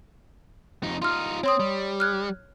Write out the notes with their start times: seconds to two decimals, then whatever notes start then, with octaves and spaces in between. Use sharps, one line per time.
0.83 F2 D#4
1.02 D#4 F4 C6 F6
1.44 C4 C#5 C6 D#6
1.60 G3
2.00 F6 F#6 G#6